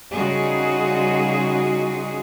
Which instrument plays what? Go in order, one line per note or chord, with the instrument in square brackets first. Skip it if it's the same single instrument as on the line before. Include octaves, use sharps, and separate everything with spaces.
[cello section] C#3 G3 D#4 F4 F#4 G#4